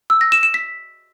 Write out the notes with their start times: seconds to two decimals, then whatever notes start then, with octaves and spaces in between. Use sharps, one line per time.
0.10 E6
0.21 A#6
0.32 E7
0.43 E7
0.54 B6